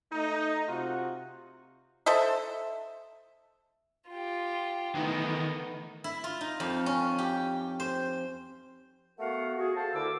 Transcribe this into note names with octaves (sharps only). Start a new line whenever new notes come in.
A3 D#4
C3 F4 F#4
A4 C5 D#5 E5
F4 G4
D#3 E3 A3 B3 D#4
E4
F4
D#4
F2
C#4
G4
C5
A3 B3 F#4 A#4 F5 F#5
F#4 G#4
A4 C5 F5 A5
D2 D3 E4 A#4 D6 E6